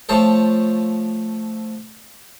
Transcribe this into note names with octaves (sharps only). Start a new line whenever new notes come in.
F3 A3 A4 C5 C#5